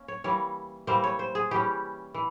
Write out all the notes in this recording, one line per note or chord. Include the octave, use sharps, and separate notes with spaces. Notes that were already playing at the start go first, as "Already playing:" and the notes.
Already playing: A#3 C#4
C#5
E3 G3 A#3 C#5
E3 G3 A#3 C5
C#5
C5
G#4
E3 G3 C#4 G4
E3